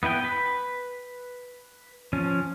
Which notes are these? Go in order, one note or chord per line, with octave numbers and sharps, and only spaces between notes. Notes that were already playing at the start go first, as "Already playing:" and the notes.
B3 E4 B4 G5
B4 B5
F3 C#4